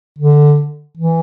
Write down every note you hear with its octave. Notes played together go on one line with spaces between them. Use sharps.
D3
E3